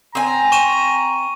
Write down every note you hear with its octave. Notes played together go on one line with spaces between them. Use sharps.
C4 G#5 A#5
C#6 D#7 E7